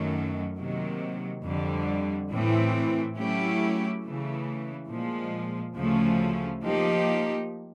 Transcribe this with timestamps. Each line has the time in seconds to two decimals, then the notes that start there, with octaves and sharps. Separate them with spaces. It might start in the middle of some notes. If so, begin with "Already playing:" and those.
Already playing: F#2 D#3 F#3 A3 C#4
0.59 C3 D#3 F#3 A#3
1.45 F2 D3 G3
2.31 A2 E3 A3 C4
3.17 F#3 A3 C#4 E4 G4
4.03 C#3 E3 A3
4.90 A#2 F3 G#3
5.76 D2 C#3 F3 A3 C#4
6.63 F3 A#3 D#4 G4